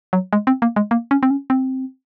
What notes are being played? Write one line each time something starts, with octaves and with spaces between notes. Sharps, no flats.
F#3
G#3
C4
A#3
G#3
A#3
C#4
C4
C#4
C4